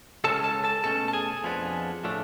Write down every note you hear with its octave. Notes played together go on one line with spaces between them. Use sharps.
C#2 C#3 G#3 C#4 A4 A5
A4 A5
A4 A5
B2 A3 C#4 A4 A5
A5
G#4 G#5
F2 F3 B3 D4
A2 F3 A3 D4